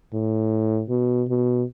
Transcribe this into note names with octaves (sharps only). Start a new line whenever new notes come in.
A2
B2
B2